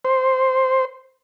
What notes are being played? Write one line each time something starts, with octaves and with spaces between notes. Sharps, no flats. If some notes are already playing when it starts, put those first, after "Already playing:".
C5